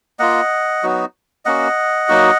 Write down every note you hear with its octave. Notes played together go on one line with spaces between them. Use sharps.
A#3 F4 D#5 F#5
F#3 B3 D#4 F#4
A#3 C#4 F#4 D#5 F#5
F#3 A#3 D#4 F#4